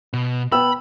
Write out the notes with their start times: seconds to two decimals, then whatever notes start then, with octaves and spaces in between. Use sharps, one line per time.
0.13 B2
0.52 B3 G5 B5 E6